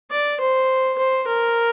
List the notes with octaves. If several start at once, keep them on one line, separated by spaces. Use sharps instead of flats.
D5
C5
C5
A#4